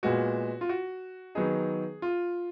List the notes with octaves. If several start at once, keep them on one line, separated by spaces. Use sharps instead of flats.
A#2 G#3 B3 F#4
F4
F#4
D#3 F#3 B3 D#4 G#4
F4